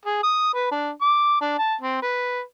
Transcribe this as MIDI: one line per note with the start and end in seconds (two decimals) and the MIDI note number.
0.06 0.22 68
0.23 0.51 87
0.54 0.70 71
0.71 0.90 62
1.01 1.39 86
1.41 1.58 62
1.58 1.75 81
1.81 1.97 60
2.02 2.41 71